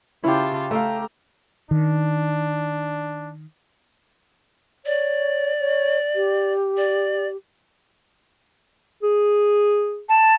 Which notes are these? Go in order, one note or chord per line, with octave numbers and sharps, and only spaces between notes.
C#3 C#4 E4 F4 G4 B4 A5 B5
A3 F5 G5 A#5 E6
D#3 D4
C#5 D5
C#5
G4
D5
G#4
A5